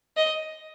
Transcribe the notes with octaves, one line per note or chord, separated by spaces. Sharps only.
D#5